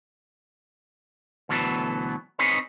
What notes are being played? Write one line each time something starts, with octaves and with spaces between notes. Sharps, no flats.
D2 B2 E3 F#3 B3 A4
C4 D#4 G#4 B4 C#5